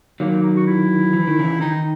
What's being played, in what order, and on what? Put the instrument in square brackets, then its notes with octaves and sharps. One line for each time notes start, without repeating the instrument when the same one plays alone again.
[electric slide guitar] D#3 F#3 [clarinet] A#3
[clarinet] D#4
F#4
E4
[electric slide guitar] E3
D#3
C#3 E3
[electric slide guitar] D#3 [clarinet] D#4